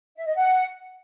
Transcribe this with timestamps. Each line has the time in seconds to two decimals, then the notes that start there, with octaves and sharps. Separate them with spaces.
0.17 E5
0.26 D#5
0.36 F#5